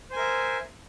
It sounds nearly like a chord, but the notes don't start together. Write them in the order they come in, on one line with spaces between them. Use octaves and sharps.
C5 G#5 A#4 E5